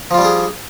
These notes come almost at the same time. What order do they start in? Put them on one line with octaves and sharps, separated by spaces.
F3 F4 G3 D4 G#4